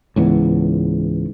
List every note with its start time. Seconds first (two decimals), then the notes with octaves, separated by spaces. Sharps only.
0.16 C#2 G#2 E3 B3